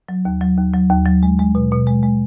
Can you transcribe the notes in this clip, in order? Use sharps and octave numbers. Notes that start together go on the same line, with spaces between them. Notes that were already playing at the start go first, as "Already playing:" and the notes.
F#3
D#2
F#3
D#2
F#3
D#2
F#3
G#3
G#3
B2
B2
G#3
G#3